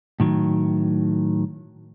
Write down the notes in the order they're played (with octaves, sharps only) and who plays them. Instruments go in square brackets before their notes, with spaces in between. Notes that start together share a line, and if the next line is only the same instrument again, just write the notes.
[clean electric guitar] A2 D#3 F#3